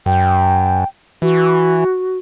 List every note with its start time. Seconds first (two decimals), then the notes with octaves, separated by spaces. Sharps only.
0.06 F#2 G5
1.22 E3 F#4